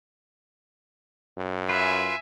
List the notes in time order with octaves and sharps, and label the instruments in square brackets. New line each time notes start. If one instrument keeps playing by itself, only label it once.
[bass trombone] F#2
[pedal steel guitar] F4 B4 [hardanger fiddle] E5 G#5